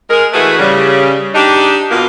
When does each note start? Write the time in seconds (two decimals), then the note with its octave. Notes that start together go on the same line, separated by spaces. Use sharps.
0.10 G#3 A#4
0.33 E3 A3 E4 F#4 G#4 B4
0.59 C#3 G3
1.34 D4 D#4 G4
1.90 B2 A#3 F4